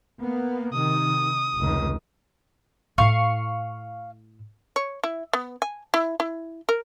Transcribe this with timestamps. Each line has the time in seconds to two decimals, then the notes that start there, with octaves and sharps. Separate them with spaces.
0.20 A#3 B3
0.73 C3 D#3 D#6
1.58 F1 C#2 D#3
2.98 A2 E4 F5 C#6
4.76 C#5
5.04 E4
5.33 B3
5.62 G#5
5.94 E4
6.20 E4
6.69 A#4